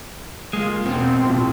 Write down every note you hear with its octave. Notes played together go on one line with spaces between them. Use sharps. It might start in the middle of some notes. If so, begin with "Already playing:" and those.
G#3 A#3 F4
E1 B2 C4
C2 A2 F3